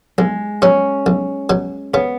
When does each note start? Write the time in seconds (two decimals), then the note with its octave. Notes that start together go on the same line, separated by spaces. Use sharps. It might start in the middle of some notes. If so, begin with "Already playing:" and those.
0.18 B1 G#3
0.62 B2 F#3 C#4
1.06 B1
1.50 B2 F#3
1.93 C#3 B3